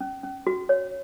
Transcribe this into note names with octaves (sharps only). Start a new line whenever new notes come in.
C#4
C#4
F#4
C#5